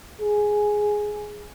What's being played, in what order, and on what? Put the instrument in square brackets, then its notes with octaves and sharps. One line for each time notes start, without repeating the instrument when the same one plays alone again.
[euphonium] G#4